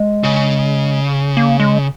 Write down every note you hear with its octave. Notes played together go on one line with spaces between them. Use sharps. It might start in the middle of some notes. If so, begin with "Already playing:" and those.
Already playing: G#3
C#3
A#3
G#3